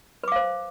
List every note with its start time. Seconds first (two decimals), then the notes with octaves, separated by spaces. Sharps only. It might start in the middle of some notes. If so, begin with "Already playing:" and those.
0.23 B4
0.28 D6
0.32 F5
0.36 C5